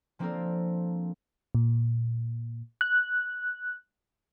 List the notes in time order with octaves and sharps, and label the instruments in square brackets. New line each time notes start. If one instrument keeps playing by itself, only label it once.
[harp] F3 A#3 C4 D4 A4 A#4
[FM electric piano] A#2
F#6